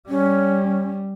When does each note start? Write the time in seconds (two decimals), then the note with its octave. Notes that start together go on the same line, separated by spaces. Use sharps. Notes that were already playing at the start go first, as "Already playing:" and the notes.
0.09 G3 C#4